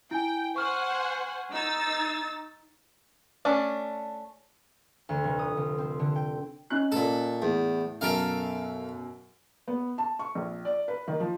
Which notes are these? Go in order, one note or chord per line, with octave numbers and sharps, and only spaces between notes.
E4 G5 G#5
C5 F#5 G#5 C#6 F6
D#4 E6 A6
A3 C#4 D4
D2
F1
D#6
C2
C4
D3
G5
C#4 D#4 F#6
A#2 A4
E2 A2
F#2 B2 A4 A#4 F5 D7
B3
A5
C#6
A#1
D5
B4
D#3
F3